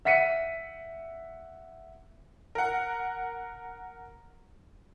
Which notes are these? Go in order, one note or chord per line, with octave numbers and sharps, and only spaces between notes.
E5 F#5 B6 C#7 D#7
A#4 F#5